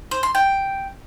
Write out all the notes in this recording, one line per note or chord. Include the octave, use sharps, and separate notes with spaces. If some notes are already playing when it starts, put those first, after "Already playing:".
C5
C6
G5